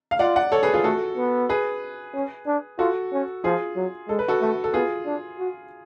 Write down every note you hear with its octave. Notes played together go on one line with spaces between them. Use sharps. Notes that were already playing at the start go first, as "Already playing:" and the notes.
F5
F4 D5 F#5
D5 F#5
A4 C#5
G#4 B4
F4 G#4
A3 F#4 A4
B3
G#4 B4
C#4
D4
F4 F#4 A4
C#4
F3 F4 G#4
F#3
G#3 A4
B4
F#4 A4
A3
A4
B3 F4 G#4
D4
F#4